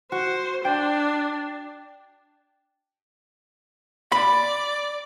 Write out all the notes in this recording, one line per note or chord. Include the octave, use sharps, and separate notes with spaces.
F#4 C5
D4 G5
D5 B5